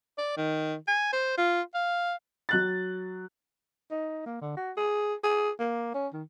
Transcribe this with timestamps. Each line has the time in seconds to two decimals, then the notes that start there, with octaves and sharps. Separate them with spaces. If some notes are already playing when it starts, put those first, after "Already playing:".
0.18 D5
0.37 D#3
0.88 G#5
1.13 C5
1.38 F4
1.74 F5
2.49 F#3 F#6 A6
3.91 D#4
4.26 A#3
4.41 D3
4.57 F#4
4.77 G#4
5.23 G#4
5.59 A#3
5.94 C#4
6.14 D#3